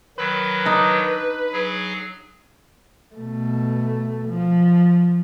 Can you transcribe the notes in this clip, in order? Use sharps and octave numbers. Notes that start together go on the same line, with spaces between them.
D#3 F#3 B4
D4 D#4
F#3 G#4
B2 A3
F3